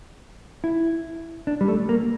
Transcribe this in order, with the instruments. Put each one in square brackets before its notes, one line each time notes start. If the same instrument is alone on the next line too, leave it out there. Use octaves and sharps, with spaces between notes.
[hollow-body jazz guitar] E4
D4
G3
A3
A#3